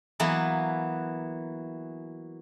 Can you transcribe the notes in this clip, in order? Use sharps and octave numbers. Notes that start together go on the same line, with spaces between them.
E3 F#3 A#3 B3